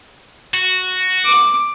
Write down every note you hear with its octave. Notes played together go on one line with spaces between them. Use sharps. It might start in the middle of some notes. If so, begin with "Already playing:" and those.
F#4
D6